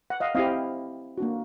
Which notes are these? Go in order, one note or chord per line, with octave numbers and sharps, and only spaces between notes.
F#5
D#5 F5
C4 E4 G4 D#5 F5
A#3 D4 F#4